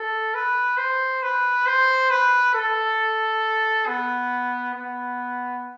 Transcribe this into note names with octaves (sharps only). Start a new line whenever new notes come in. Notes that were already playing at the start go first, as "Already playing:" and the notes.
Already playing: A4
B4
C5
B4
C5
B4
A4
B3
B3